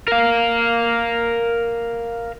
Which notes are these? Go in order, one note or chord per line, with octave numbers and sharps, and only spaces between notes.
A#4 F5